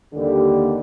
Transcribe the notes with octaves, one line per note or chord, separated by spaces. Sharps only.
D#2 D3 G3